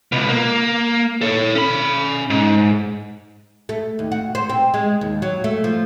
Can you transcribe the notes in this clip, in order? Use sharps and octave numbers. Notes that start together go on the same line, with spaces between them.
C#2 B2
A#3
A4 C#5
C#4 B5
G#2
A3
D#2
F#4
C5
C4
G#3
D#2
F#3
A3
F3